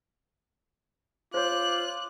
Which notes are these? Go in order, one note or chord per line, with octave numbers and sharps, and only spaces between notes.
F4 C5 C#5 D6 F#6